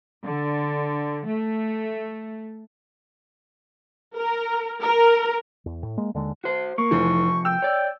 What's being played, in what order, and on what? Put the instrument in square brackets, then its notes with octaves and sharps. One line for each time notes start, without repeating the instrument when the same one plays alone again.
[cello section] D3
A3
[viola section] A#4
A#4
[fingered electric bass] E2
A2
G#3 A#3
D#2 D3 G#3
[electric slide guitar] F#4 C5
[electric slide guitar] A#3 [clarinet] C#6
[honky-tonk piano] F1 E3 [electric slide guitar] C3 F3
[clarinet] G5 [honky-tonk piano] E6
[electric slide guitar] C#5 D5